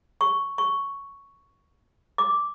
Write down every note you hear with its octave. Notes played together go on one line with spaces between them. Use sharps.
C#6
C#6
D6